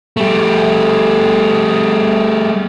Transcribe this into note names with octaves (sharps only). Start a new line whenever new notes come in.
G3 A3